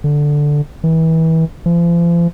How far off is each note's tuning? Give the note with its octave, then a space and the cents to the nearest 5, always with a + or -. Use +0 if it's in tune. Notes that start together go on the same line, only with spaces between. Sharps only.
D3 +0
E3 -30
F3 -40